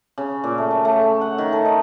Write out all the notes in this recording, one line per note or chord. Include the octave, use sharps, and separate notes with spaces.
C#3
A#2
A3
F#3
A3
F#5
D#3
A4
D#4